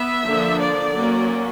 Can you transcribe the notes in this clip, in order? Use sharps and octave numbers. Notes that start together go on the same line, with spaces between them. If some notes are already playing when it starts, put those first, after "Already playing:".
Already playing: B3 E5
D3 F3 A#3 D4
D5
F#3 A#3 C#4